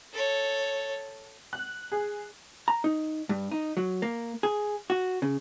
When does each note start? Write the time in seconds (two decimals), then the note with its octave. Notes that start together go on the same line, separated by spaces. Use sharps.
0.14 A4 C#5
1.53 F#6
1.92 G#4
2.68 A#5
2.84 D#4
3.29 G2
3.51 D#4
3.77 F#3
4.02 A#3
4.43 G#4
4.90 F#4
5.22 C#3